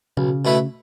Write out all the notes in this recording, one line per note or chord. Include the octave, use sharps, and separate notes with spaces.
B1 C#3
B2 A3 E4 B4